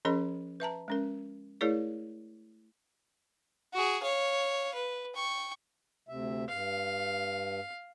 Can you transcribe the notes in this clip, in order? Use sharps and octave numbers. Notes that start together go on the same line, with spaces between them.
F3 C#4 G#4 A#4 D#5 B5
B4 E5 A5 A#5
G#3 C#4 A#4
A3 E4 G#4 A#4 C#5 D5
F#4 G#4
C#5 F5
B4
G5 C#6
D2 C3 E5
G2 F5